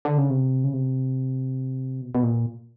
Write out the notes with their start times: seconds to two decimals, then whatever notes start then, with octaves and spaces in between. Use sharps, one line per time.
0.05 D3
0.18 C#3
0.30 C3
0.64 C#3
0.73 C3
2.01 B2
2.15 B2
2.23 A#2